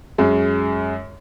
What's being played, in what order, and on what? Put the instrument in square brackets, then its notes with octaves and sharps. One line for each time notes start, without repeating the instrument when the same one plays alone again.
[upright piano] F#2 G#3